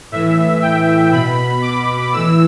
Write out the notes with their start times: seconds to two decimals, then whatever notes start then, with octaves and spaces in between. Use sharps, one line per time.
0.12 A2 E3 E5
0.62 G5
1.12 B2 B5
1.62 D6
2.13 A2 E3 E6